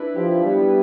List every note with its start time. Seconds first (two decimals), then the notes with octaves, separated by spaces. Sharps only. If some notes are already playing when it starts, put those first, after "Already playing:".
Already playing: D4 E4 B4
0.16 F3 G4
0.45 G3 B3